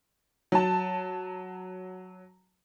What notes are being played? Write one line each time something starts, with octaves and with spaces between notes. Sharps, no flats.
F#3 A5